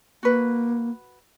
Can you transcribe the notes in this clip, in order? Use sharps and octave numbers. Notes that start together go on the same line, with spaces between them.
A#3 F#4 B4